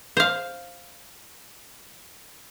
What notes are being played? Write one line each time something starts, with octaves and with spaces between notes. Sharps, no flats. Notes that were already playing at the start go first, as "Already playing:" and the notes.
C5 F5